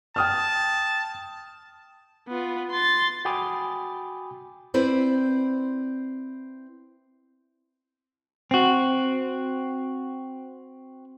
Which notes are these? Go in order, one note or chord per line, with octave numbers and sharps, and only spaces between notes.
G5 A5 D#6 F6
B3 F4
C6 A6
F#4 G5 G#5 B5 D6 D#6
C4 E4 B4 C5 D5
C4 F#4